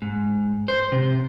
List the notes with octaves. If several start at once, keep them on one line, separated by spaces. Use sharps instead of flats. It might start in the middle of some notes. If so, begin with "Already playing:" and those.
G#2
C5
C3